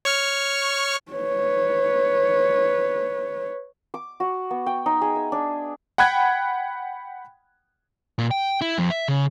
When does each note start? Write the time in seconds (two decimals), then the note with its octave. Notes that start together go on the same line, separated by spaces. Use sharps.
0.05 C#5 C#6 F6
1.12 B4 C#5
3.94 D6
4.20 F#4
4.50 B3
4.66 G5
4.86 D#4
5.01 G#4
5.16 E5
5.32 D4
5.98 F#5 G5 B5 F#6 G#6
8.19 A#2
8.31 G5
8.61 E4
8.78 F2
8.90 E5
9.08 C#3